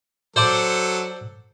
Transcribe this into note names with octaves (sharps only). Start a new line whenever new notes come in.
F#3 A4 C5 D5